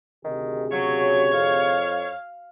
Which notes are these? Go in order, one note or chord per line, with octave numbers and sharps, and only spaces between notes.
D2 C3 D#3 G#4
C#3 F#3 C#5
F2 F5